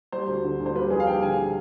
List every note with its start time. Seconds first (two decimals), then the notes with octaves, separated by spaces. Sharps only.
0.12 G3 C5
0.28 D2
0.44 D3
0.60 D2
0.66 C5
0.75 G3 B4
0.90 F2 G#4
1.00 F5
1.07 G3 G5
1.22 D3 G#5